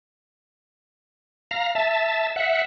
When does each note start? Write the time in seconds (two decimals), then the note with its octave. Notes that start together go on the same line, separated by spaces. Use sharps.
1.51 F5 A#5
1.75 E5 A5
2.36 E5 F#5